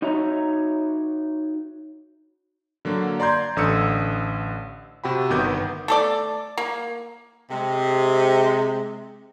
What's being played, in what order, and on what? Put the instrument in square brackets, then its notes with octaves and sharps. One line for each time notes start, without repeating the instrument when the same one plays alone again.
[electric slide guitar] D#4 F#4 C#5 E5 A#5
[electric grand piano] D3 F#3 A#3
D5 A#5 C6 G6 G#6
A1 D3 D#6 E6 C#7
C3 F#4 G5 B5
G1 D#3 B3 D6 G6
[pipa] A3 A4 D5
A#3
[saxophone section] C3 G#3